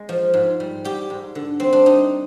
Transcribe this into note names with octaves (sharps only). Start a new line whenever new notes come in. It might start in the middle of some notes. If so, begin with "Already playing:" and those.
Already playing: G#3
F3
G#2
G3
G3 G4
G#2
D3
G3 C4
D4
G3 D#4